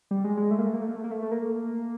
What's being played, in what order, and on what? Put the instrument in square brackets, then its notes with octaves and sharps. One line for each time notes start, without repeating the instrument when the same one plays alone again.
[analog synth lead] G3
G#3
G#3
A3
A#3
A3
A#3
A3
A#3
A3
A#3
A3
A3
A#3